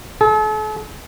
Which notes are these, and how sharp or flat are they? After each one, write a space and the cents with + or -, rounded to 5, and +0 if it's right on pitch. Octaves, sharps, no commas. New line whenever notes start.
A4 -45